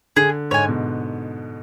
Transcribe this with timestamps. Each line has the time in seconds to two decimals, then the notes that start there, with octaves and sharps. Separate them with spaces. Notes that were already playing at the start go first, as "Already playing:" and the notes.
0.16 D3 G#4
0.51 G#2 C#5 G#5
0.68 B2